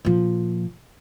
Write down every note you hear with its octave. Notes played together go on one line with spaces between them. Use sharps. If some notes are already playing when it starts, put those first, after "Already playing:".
A#2 F3